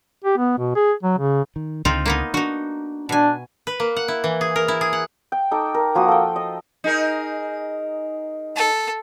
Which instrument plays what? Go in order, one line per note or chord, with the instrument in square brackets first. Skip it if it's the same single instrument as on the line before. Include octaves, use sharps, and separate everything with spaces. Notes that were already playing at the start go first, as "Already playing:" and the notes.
[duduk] G4
B3
B2
G#4
F#3
C#3
[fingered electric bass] D#3
[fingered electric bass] C#2 D3 [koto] C4 D#4 F4
[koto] A#3 B3 D#4
[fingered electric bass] D4 [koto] D#4 F#4
[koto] B2 G#5 [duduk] D4
[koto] B4
A#3
F#5
E4
E3
G#4
A#4
E4
G#4
F#5
[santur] G5
D#4 A4 D6
A#4
F3 A#3 F#4 D#6
A4 G5
D#5
[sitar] D#4 G#4 A#4
[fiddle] A4